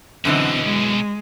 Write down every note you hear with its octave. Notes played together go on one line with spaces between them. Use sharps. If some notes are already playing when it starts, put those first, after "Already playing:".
F#2 B2 D3 E3 C4 C#4 D#5
G#3